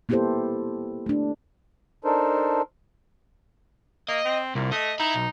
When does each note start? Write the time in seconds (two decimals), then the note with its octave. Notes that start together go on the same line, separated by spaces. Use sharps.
0.09 A#3 B3 E4 G4 A4 C5
1.06 A3 D4
2.05 D4 D#4 A4 A#4 C5
4.09 A#3 D#5
4.25 C4
4.55 C2 A#2
4.72 A3 D#5
5.00 D#4 E5 B5
5.14 B1